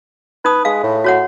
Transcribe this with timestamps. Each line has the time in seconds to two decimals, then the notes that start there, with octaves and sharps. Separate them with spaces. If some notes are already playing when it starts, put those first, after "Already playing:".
0.45 D#4 B4 D#6
0.65 G#3 F5
0.83 A2
1.04 F#4 C#5 F#5